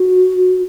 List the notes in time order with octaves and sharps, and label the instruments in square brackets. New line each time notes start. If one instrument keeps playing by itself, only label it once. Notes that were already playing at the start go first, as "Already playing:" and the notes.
Already playing: [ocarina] F#4